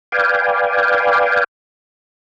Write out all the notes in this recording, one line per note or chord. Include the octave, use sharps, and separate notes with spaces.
B4 D5 F5 G5 G#5